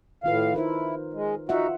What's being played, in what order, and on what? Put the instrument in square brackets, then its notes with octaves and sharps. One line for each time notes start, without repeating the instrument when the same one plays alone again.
[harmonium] A2 F5 [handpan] D#3 F4 B4
[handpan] D#4 A#4 C5 [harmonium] E4
[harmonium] G#3
[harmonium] D#4 F#4 [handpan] F4 E5 F#5